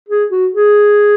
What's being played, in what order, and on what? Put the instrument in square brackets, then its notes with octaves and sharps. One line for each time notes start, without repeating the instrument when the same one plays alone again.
[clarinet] G#4
F#4
G#4